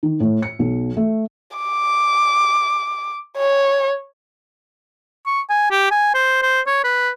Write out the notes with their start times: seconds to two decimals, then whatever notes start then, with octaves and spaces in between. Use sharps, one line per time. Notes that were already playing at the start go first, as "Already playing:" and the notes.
0.03 D#3
0.20 A2
0.42 C#7
0.59 B1
0.97 A3
1.57 D6
3.38 C#5
5.26 C#6
5.49 G#5
5.71 G4
5.91 G#5
6.14 C5
6.42 C5
6.66 C#5
6.84 B4